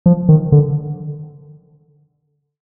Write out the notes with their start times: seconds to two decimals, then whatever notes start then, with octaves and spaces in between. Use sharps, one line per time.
0.06 F3
0.29 D#3
0.52 D3